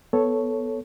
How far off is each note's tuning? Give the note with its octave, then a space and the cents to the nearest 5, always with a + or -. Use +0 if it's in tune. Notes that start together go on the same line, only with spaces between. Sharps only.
B3 +0 A4 +0 C#5 +0